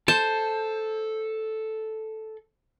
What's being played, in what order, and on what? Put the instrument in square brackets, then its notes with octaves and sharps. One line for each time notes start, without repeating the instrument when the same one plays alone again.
[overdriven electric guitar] A4 [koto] C5 [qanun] A5